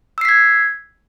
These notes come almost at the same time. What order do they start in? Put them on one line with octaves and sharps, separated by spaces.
E6 C7 B6 G#6